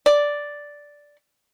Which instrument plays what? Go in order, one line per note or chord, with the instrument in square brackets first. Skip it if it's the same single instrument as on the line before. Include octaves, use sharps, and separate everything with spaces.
[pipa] D5